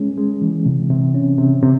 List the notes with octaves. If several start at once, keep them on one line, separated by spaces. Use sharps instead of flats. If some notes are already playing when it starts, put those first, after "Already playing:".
Already playing: G#3 C#4
G#3
E3
C3
C3
C#4
C3
C3